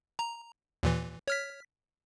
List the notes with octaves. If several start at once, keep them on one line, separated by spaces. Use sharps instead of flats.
A#5
D#2 A#2 E3
C#5 F6 B6